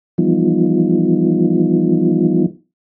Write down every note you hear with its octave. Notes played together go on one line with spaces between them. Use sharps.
E3 F3 G3 B3 D#4 F4